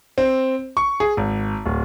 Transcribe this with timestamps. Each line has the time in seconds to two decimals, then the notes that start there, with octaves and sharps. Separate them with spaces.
0.18 C4
0.77 C#6
1.00 G#4
1.17 G#1
1.66 D1